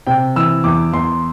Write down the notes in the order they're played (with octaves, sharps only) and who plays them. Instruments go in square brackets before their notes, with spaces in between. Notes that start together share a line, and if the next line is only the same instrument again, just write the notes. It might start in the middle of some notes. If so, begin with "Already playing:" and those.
[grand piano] C3 G5
E3 E6
E2 D6
E2 C6